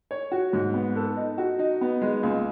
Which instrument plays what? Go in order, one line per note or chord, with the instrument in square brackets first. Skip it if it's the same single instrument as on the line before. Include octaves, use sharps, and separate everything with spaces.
[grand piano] C#5
F#4
G#2
B3
A4
D#4
F#4
D#4
B3
G#3
C#2